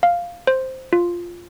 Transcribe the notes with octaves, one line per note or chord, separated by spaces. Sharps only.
F5
C5
F4